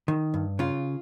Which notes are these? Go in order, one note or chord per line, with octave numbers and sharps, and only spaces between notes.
D#3
G2
C#3 F4